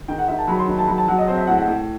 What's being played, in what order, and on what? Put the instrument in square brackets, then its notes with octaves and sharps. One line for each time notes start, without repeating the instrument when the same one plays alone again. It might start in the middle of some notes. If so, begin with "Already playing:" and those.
[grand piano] D#3 [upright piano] G5
[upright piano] F#5
[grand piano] D#3 [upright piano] E5
[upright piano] A5
[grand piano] F#3 [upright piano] B5
[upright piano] C6
[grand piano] D#3 [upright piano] B5
[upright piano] A5
[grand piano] F#3 [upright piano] B5
[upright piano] A5
[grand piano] F#3 [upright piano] F#5
[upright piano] D#5
[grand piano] C4 [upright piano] C5
[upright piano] E5
[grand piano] A2 [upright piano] F#5
[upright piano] F#5
[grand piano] A2